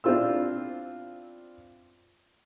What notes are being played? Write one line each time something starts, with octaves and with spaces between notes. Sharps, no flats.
C4 D4 E4 F4 C5 E6